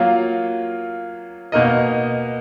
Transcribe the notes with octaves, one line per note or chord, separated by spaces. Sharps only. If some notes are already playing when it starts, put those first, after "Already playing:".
Already playing: F#3 A#3 F4
B2 A#3 D#4 A#4 D#5